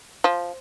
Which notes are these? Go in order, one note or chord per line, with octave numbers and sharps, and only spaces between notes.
F3